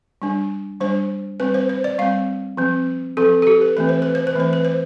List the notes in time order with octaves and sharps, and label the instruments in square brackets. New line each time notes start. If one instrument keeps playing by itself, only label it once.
[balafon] G3 D4
G3 D4 C5
G3 C4 B4
C5
C5
D5
G3 C4 F5
F3 C4
F3 C4 A4
A4
G4
B4
E3 A3 C4 B4
C5
B4
C5
B4
E3 A3 C4 C5
B4
C5